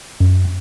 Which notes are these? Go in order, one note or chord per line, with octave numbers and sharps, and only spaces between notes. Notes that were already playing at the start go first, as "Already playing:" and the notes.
F#2